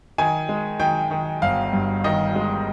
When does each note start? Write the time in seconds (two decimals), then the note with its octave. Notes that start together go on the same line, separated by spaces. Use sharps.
0.18 D#3 G#5
0.49 G#3
0.79 D#3 G5
1.11 D#3
1.42 G1 F5
1.73 G2
2.04 D#3 D#5
2.36 G#3